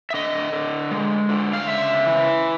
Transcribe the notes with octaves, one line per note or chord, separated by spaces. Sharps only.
E5
D3 D#5
D3
G#3
D3
F5
C#3 E5
E3